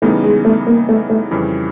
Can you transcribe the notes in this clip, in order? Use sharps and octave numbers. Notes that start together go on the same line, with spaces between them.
C#3 E3 G3 A3 B3 D#4
G#3
A3
A#3
A3
A3
F2 C#3 E3 G3